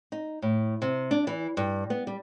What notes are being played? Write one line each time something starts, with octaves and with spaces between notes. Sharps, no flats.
D#4
A2
C3
D4
E3
G2
B3
G3